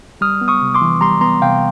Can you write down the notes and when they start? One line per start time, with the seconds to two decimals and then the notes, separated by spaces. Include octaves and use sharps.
0.21 G3 D#6 F6
0.41 B3
0.48 C#6 D#6
0.62 C3
0.74 C6 D6
0.82 E3
1.01 G3 A#5 C6
1.21 B3 A#5 C6
1.42 C3 F5 G5